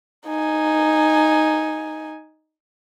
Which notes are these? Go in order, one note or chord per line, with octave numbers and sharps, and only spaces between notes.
D#4 G#5